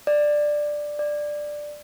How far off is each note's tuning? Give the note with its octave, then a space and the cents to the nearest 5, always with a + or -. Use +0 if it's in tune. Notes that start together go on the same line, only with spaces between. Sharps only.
D5 +10
D5 +10